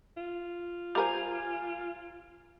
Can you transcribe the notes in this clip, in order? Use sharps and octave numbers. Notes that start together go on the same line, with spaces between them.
F4
G3 A#4 C5 F5 G#5